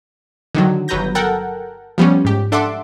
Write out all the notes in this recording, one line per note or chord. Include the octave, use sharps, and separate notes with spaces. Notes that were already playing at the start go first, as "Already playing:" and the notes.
D3 D#3 F#3
G1 F#3 B4 A#5 G6 A#6
A4 A#4 F#5 G5
F3 G3 B3 C#4
G#2 G4
D4 A4 E5 F#5 C6 D6